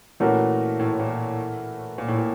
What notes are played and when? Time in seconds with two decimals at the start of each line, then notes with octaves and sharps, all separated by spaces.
0.20 A#2 E3 A3 C#4 F#4 A#4
0.80 A2
1.00 A#2
1.98 A#2
2.08 A2
2.18 A#2